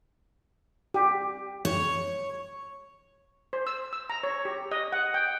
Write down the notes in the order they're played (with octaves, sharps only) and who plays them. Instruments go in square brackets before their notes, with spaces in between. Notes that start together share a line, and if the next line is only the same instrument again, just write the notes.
[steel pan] G4
[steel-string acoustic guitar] C#5
[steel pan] C5
E6
E6
A#5
C#5
G4
D#5
F#5
G5